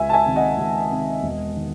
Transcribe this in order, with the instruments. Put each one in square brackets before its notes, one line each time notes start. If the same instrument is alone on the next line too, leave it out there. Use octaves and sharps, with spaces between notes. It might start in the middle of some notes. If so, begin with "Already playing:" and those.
Already playing: [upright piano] C#2 E5 G#5
A5
E5 G#5
C3 D#3
D#5 F#5
C#2
C3 D#3
E1
D#3